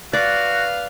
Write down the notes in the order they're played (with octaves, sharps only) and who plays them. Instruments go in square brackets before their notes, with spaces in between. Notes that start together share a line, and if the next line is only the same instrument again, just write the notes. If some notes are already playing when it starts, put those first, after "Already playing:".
[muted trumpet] F#4 [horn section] B4 F5 [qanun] D5